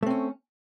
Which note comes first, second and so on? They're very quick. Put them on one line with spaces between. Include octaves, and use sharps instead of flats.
A3 C4 C#4